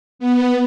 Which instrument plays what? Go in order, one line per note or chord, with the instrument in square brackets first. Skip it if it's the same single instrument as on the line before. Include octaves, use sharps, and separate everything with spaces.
[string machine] B3